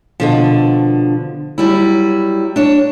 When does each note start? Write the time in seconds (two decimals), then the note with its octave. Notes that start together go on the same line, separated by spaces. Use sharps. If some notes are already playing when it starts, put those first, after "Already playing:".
0.20 B2 D3 F3
1.58 F#3 G3 E4
2.56 D4 C#5